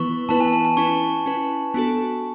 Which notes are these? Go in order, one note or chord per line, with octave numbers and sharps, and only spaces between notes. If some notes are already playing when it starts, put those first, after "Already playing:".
Already playing: E3 B3 E4 B4 C#6
E3 B3 E4 B4 A5
G#5
A5
A5
C#4 E4 B4 C#6
C#4 E4 B4
B3 D4 F#4 A4